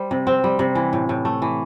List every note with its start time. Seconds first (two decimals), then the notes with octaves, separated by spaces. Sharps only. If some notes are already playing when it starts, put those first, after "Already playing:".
Already playing: G3 C5
0.11 C3
0.27 C4
0.44 G3
0.59 C3
0.75 E3
0.93 A2
1.09 A2
1.25 A3
1.42 E3